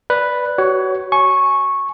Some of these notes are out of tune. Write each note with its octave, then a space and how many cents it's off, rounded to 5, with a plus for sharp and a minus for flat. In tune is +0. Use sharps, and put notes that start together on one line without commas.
B4 +0 D5 +0
F#4 +30 C#5 +0
G#5 +25 C#6 -10